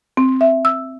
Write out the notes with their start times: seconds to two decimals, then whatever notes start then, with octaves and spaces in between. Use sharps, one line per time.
0.17 C4
0.41 E5
0.65 E6